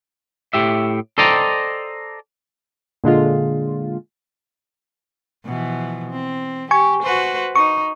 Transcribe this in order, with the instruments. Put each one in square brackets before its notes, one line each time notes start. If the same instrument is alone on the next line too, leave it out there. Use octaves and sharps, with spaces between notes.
[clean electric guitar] A2 G4 E5
A4 C5 D5 D#5 G5 A#5
[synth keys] A#2 D3 G#3 F4
[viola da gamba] B2 E3 F3
C4
[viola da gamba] G4 [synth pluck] G#5 C#6
[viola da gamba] F#4 B4 C5
[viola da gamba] D#4 [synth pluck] C#6